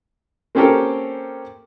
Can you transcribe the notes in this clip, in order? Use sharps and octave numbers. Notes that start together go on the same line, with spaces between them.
A#3 C4 C#4 G4 A4 A#4